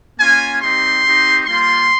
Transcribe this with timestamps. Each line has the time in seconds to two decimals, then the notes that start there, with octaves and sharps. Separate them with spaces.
0.20 A#3 C#4 F4 G#5
0.62 G3 C4 D#4 G4 C6
1.04 C4 D#4 G4
1.46 G3 A#3 F4 C6